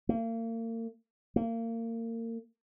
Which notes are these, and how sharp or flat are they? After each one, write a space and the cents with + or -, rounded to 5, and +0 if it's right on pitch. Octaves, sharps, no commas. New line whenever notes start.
A#3 -40
A#3 -30